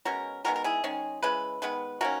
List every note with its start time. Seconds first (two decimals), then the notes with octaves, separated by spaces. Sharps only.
0.05 B2 G#3 C#4 F#4 A#4
0.44 D#3 G#3 B3 F#4 A#4
0.56 A#4
0.64 E4 G#4
0.84 D#3 G#3 C#4
1.23 C#3 E3 G#3 B4
1.62 D#3 G#3 B3 B4
2.01 D#3 A#3 C#4 F#4 A#4